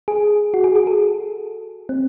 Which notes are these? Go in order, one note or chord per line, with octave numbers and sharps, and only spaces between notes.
G#4
F#4
G#4
G#4
A4
C4